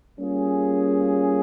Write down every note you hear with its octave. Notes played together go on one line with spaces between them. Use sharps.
G3 A#3 C#4 F4 G#4